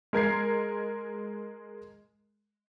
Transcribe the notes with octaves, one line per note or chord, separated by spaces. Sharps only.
G#3 A#4 G#6 C7